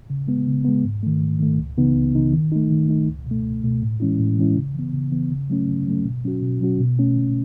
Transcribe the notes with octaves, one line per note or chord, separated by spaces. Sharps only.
C#3
G#3 B3
C#3
G#3 B3
G#2
D#3 A3
G#2
D#3 A3
C#2
C#3 E3 B3 D#4
C#2
C#3 E3 B3 D#4
D#3
A3 D#4
D#3
A3 D#4
C#2
B2 A3
C#2
B2 A3
A2
E3 G#3 C#4 E4
A2
E3 G#3 C#4 E4
C#3
E3 B3
C#3
E3 B3
C#3
F#3 A3 C#4
C#3
F#3 A3 C#4
B2
F#3 C#4 F#4
B2
F#3 C#4 F#4
B2
A3 C#4
B2